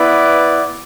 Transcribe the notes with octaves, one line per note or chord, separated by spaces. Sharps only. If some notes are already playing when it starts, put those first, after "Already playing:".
Already playing: B3 E4 B4 D5